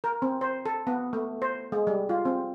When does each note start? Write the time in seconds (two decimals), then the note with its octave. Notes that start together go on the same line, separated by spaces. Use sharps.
0.04 A#4
0.22 C4
0.41 C5
0.66 A4
0.87 B3
1.13 A3
1.42 C5
1.72 G#3
1.87 G3
2.09 F4
2.25 C4